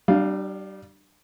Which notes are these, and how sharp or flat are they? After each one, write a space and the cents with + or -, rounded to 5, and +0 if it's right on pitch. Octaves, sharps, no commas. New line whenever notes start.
G3 -30 D4 +25 F5 +0